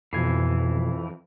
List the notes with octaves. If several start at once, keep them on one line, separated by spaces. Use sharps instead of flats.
F2 B2 E3 G#6 C7